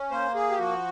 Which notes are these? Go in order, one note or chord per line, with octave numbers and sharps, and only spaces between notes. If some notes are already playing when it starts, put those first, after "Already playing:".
Already playing: C#4
A#3 C5
G#4
G4
F3 F#4